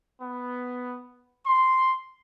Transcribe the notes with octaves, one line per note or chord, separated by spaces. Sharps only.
B3
C6